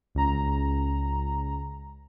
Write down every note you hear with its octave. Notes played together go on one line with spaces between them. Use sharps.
C#2 A#5